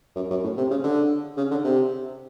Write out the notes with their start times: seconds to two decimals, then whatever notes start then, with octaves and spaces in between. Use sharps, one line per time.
0.16 F#2
0.30 F#2
0.44 A2
0.57 C3
0.71 C#3
0.84 D3
1.37 C#3
1.51 D3
1.64 C3